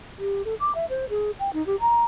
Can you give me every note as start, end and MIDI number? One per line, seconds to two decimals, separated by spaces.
0.18 0.42 67
0.45 0.55 69
0.60 0.74 86
0.75 0.85 76
0.89 1.06 72
1.09 1.31 68
1.40 1.52 79
1.53 1.65 63
1.66 1.76 67
1.80 2.04 82